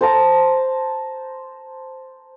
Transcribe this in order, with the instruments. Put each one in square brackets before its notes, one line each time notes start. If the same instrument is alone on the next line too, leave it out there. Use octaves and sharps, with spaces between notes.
[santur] C5 A5 A#5